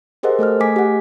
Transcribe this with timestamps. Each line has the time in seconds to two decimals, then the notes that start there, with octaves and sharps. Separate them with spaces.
0.23 G4 G#4 A#4 C5 D#5 F#5
0.39 A3 A4 D#5 F6
0.60 A3 G#4 D#5 G#5 D6 B6
0.76 G4 F#5